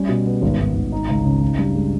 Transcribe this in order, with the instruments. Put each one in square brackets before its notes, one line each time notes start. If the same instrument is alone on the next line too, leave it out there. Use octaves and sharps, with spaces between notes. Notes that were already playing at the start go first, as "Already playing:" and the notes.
Already playing: [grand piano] G3 C#4
B2
B3
G#1
G#1
G#1
D#4
C#2
C#3
D#4
G2
G#3